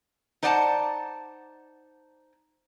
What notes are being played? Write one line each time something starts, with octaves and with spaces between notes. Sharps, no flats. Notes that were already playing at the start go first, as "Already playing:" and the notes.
D#4 C5 D5 F#5 G#5 A5